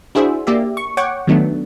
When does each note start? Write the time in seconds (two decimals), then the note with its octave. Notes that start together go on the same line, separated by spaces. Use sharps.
0.15 D4 E4 F#4 G#4 C5 E5
0.47 A#3 G4 D5 E5
0.77 C#6
0.97 C#5 F#5 G5 C#6 D6
1.27 D#3 F#3 A3 B3 D4